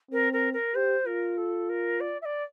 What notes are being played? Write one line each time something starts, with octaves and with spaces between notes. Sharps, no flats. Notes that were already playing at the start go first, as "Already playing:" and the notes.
C4 A#4
A#4
A#4
G4 C5
F4 A#4
A4
A#4
D5
E5
D5